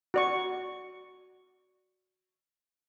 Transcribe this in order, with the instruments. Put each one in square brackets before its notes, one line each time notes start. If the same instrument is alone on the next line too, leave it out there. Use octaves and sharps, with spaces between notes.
[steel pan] F#4 D5 C#6